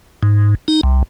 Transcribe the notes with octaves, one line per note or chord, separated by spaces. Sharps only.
G#2
D#4
C2